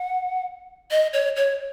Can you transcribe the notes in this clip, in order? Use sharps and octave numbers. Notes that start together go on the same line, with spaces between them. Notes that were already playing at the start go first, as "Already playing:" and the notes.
Already playing: F#5
D#5
C#5
C#5